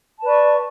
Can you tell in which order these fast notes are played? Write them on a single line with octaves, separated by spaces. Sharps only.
A5 B4 D5 C#6